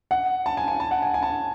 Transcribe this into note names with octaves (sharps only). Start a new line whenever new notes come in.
F#5
A5
G#5
G#5
A5
F#5
G#5
G#5
A5